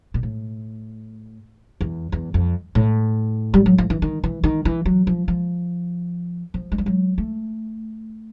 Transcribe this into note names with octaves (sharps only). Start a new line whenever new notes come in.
A#2
A2
E2
E2
F2
A2
G3
F#3
F3
E3
D#3
E3
D#3
E3
F#3
F3
F3
F3
G#3
G3
F#3
A3